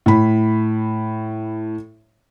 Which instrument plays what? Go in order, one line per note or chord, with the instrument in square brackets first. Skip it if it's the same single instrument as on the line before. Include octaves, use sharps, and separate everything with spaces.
[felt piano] A2 B5